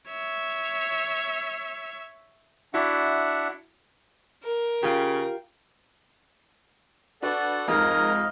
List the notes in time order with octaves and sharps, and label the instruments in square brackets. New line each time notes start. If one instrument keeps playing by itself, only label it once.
[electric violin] C#5 E5
[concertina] D4 E5 F#5 [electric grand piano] E4 F#4
[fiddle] A#4
[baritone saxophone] C#3 [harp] F4 G4
[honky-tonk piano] D4 F#4 B4 [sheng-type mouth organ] A4 D5 F#5
[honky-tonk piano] F2 G#2 G#3 [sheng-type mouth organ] A#4 G#5 A#5 [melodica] D#5 F5